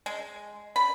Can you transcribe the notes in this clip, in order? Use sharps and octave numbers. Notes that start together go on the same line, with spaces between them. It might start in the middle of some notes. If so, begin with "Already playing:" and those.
G#3
B5